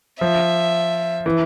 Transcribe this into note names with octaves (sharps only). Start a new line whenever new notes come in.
F3 E5
E3